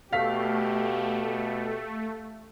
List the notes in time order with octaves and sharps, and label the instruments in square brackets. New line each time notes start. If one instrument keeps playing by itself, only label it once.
[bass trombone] B2 [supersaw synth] A3 [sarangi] G4 [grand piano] F5 B6